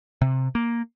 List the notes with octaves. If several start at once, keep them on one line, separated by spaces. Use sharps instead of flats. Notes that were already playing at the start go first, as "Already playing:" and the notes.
C3
A#3